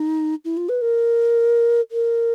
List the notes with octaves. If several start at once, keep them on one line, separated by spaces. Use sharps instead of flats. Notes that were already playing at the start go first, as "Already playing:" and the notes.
Already playing: D#4
E4
F4
B4
A#4
A#4